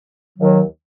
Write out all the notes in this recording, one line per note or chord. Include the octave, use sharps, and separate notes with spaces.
D#2 D#3 F#3